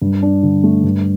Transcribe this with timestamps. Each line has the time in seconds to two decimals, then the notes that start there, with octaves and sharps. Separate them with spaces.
0.01 G2
0.22 D4
0.43 D3
0.64 A3
0.84 G2